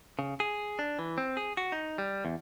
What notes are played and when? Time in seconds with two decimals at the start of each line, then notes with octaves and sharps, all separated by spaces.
0.19 C#3
0.40 G#4
0.79 D4
0.99 E3
1.18 C4
1.37 G#4
1.57 F#4
1.72 D#4
1.98 G3
2.25 E2